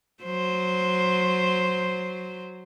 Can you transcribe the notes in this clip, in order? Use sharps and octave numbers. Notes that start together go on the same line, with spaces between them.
F#3 C5